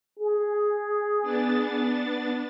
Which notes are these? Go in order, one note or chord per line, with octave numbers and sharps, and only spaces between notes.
G#4
B3 D4 A6